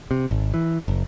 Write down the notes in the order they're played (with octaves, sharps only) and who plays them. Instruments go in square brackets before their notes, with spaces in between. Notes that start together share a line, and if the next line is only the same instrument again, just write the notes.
[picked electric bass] C3
G#1
E3
F#1